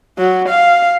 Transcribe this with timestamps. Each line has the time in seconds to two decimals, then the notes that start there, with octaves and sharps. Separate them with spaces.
0.18 F#3
0.49 F5